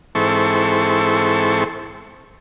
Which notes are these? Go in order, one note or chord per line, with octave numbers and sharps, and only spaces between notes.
G#2 E3 C4 A4 C#6